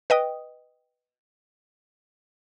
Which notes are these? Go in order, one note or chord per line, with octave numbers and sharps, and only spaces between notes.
B4 D#5 G5 D#6